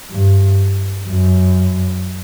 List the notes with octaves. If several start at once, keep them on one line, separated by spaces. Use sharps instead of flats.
G2
F#2